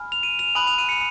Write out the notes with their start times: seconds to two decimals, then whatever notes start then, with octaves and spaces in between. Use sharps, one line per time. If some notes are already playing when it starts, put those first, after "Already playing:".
Already playing: G#5 B5 F6
0.12 F7
0.23 D#7
0.39 F7
0.55 G#5 B5 D#6 F#6 F#7
0.67 F7
0.78 D#7
0.89 C#7